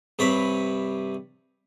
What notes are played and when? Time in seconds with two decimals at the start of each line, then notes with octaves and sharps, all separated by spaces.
0.19 G2 C3 C#5 B5